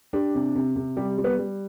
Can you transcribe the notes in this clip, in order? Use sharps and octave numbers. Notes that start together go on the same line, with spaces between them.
D4 G4
C3
C3
C3
G3 G4
G3
B3 B4
G3